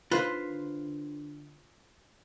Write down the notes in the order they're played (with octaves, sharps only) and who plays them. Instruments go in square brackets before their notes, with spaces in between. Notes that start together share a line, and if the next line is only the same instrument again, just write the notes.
[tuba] D3 [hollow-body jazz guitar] F4 C5 [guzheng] B4